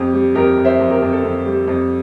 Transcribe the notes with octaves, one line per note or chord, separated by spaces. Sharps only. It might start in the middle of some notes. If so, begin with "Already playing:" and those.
Already playing: F2 G4
G3
F2 G4 A#4
F2
C5 E5
F2
G4 A#4
F2
A4
F2
G3
F2